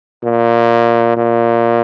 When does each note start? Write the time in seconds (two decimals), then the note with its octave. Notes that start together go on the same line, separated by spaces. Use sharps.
0.24 A#2
1.17 A#2